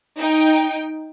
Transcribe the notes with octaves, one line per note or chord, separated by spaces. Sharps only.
D#4 G5